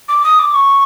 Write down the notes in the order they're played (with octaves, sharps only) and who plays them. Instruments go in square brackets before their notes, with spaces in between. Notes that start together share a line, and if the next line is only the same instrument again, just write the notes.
[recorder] D6
D#6
D6
C#6